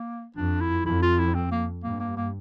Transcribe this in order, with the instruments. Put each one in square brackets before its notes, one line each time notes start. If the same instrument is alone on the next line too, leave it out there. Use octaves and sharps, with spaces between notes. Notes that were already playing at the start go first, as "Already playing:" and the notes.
Already playing: [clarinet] A#3
[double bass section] F2 [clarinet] D4
[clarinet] E4
[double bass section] F2 [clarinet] E4
[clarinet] F4
E4
C4
A#3
[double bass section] G2 [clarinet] A#3
[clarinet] A#3
A#3